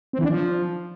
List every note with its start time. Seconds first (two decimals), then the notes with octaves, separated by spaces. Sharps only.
0.13 C4
0.19 E3
0.24 D4
0.30 F3